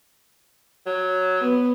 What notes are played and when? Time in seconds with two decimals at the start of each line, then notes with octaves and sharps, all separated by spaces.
0.86 F#3
1.40 B3